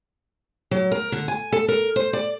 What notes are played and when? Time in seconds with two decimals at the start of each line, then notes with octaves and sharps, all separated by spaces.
0.71 F#3
0.92 A#4
1.12 D3
1.28 G#5
1.52 A4
1.68 A#4
1.96 C5
2.13 D5